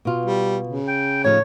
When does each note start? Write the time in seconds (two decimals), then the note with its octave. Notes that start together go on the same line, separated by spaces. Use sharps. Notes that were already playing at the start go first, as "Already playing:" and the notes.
0.05 B2 F4
0.26 G3
0.67 C#3
0.88 G5
1.24 A2 F3 D#4 C#5